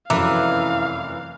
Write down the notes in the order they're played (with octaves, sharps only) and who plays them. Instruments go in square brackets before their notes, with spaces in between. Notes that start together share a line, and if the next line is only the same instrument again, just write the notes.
[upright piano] F1 F#2 [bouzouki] E3 [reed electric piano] E5 A#5 D6 [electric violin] F5